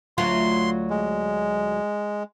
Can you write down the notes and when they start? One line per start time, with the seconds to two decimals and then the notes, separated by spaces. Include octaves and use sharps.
0.18 D2 F#3 F4 C6
0.90 G#3